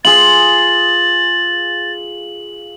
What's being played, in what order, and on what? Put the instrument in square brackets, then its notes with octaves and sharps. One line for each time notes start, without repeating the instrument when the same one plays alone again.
[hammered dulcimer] F4 G#4 [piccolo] A6 [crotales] F#7